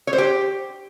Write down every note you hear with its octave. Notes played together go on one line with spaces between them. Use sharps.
C#5
C5
G4